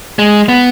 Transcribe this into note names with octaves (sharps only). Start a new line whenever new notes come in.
G#3
B3